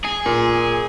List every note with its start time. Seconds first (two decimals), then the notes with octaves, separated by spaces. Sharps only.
0.05 G#4
0.26 A#2